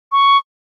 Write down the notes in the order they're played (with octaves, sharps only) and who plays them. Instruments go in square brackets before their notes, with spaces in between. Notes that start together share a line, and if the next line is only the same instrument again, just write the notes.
[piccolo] C#6